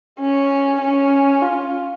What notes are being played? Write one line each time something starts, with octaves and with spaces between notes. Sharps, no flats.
C#4
C#4
F4